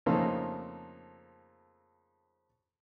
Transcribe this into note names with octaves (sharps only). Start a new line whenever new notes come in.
F2 C#3 A3 A#3 C4 D#4